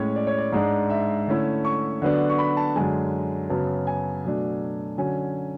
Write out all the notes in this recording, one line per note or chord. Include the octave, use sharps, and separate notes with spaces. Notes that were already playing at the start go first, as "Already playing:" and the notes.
Already playing: A2 G#3 C#4 C#5
D5
C#5
D5
G#2 G#3 D4
E5
D3 A3 C#4 E4
C#6
D3 F#3 B3 D4
C#6
B5
A5
F#2 D3 G#3 G#5
F#2 C#3 F#3 B3 A5
G#5
B2 F#3 A3 D4
D3 F#3 C#4 G#5